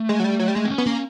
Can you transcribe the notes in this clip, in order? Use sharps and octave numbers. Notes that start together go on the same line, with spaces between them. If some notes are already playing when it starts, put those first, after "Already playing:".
Already playing: A3
G#3
F#3
G3
F#3
G3
G#3 A3
C4
C#4
B3
A#3 C#4